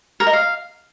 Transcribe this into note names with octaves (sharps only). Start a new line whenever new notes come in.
A#4
D#5
F5